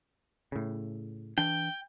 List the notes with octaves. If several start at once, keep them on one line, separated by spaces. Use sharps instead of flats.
A2 C#3
E3 D4 G5